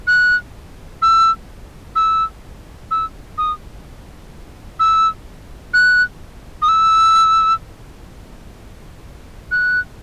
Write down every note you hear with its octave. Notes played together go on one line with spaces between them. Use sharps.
F#6
E6
E6
E6
D#6
E6
F#6
D#6
E6
F#6